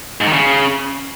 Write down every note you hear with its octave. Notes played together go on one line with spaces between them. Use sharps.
G#2
D#3
C#3